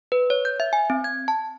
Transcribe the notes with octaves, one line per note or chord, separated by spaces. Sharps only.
B4
C#5
G6
E5
G#5
C4
G#6
A5